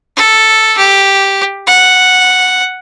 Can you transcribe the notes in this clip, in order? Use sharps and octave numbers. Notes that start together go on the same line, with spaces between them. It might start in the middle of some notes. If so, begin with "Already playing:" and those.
A4
G4
F#5